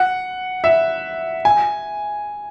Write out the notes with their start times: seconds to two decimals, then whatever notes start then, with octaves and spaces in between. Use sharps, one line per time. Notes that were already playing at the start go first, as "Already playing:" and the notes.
Already playing: F#5
0.64 E5
1.45 G#5